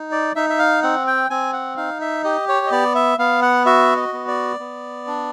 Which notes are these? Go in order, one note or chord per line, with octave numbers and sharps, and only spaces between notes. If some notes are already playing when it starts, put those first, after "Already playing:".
Already playing: D#4
D5
D#4 E5
E5
F5
C4 F#5
G5
C4 G#5
F#5
D#4 F5
E5
G4 D#5
C#5
D#5
B3 D5
E5
B3 F5
F#5
F#4 E5
D#5
B3
D5
B3
D4